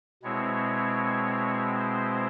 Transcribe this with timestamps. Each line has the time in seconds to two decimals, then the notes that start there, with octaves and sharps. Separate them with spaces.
0.23 B2 G#3 C4 E4 C#5
1.78 C5